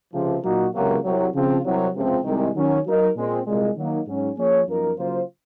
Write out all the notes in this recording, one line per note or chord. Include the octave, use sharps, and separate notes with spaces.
C#2 C3 F3
A#2 F#3 A#3 D#4 F#4
C#2 C3 F#3 A#3
C2 C3 F#3
C#3 F3 C4 F4
C2 C3 F#3
C#2 C3 F3 C4
C2 C3 D#3 G#3
D#3 F#3 C#4
F#3 A#3 D#4 A#4
A#2 G#3 C4
C2 A#2 G#3
D#3 F#3 A#3 D#4
G#2 F#3 C#4
F3 A#3 C#4 G#4 C#5
F#2 F3 A#3 D#4 A#4
C#3 F#3 A#3 F4 C5